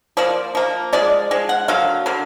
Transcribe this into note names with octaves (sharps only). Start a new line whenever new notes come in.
F3 A#3 D5
F3 A#3
F3 G#3 D5
F3 G#3
F#5
D3 F#3 A#3 F5
D3 F#3 A#3